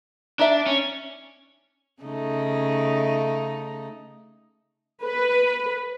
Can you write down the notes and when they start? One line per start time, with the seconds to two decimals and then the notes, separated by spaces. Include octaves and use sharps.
0.39 D4 D#4 E5
0.66 C#4
2.02 C#3 A3 D#4
5.04 B4